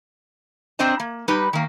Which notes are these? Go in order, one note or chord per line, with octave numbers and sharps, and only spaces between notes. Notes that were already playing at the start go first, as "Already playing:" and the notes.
C4 D4 C5 D#5 A#5
A#3
G3 D#4 G4 B4
D#3 A#3